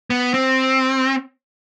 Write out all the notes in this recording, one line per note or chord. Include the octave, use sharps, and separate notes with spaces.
B3
C4